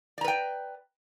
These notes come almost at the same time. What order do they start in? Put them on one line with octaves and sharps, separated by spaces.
D5 A#5 B4 G5